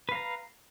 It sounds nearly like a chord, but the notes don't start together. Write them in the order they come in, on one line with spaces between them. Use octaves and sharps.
B4 F5 A#5